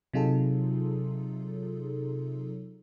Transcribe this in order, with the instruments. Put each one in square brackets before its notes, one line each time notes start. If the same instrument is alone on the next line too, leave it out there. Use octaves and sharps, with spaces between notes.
[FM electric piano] C3 F#3 D#4 F4 G#4 A4